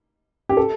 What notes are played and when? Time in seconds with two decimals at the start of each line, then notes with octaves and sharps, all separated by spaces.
0.49 G4
0.57 A4